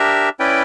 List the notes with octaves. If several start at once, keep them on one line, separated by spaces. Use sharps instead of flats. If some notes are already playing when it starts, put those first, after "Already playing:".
Already playing: D4 G4 A#4 E5
C#4 E4 B4 D5 G5